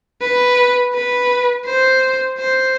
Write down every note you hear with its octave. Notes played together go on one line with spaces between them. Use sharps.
B4
B4
C5
C5